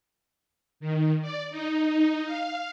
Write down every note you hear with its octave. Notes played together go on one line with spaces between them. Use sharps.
D#3
D5
D#4
F5